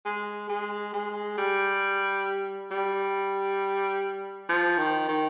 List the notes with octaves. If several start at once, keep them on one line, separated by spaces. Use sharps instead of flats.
G#3
G#3
G#3
G3
G3
F3
D#3
D#3